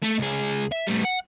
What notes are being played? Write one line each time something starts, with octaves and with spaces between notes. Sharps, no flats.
A3
C#2 G#4
E5
A2 G3
F#5